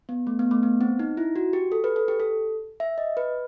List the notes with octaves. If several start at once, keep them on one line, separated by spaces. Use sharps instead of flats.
B3
A3
B3
A3
B3
C4
D#4
E4
F#4
G4
A4
B4
A4
G4
A4
E5
D#5
B4